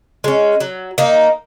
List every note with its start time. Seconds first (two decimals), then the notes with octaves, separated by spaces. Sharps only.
0.24 G#3 C#4
0.60 F#3
0.98 A#3 D#4